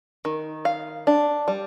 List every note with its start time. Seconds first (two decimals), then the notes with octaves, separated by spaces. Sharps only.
0.25 D#3
0.65 F5
1.07 D4
1.48 G3